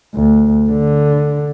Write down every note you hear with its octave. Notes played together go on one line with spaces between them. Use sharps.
D2
D3